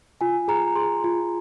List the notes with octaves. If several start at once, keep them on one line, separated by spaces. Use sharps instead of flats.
F4 G#5
G#4 A#5
G#4 C6
F4